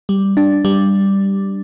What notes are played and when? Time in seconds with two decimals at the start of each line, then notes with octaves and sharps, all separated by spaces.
0.09 G3
0.37 D4
0.65 G3